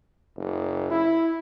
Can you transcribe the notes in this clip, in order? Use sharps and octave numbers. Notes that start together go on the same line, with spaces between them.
F#1
E4